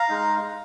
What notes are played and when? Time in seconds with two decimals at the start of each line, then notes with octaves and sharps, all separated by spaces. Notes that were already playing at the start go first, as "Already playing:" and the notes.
Already playing: F5 A#5
0.09 G#3 D#4